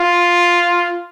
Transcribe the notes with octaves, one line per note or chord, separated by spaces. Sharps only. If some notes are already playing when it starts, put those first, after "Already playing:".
Already playing: F4